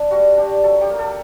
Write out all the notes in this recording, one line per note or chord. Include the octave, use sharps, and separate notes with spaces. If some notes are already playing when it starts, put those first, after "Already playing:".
Already playing: D4
G3 F#4
D4 G4
F#3 A4
G4
A#3
A4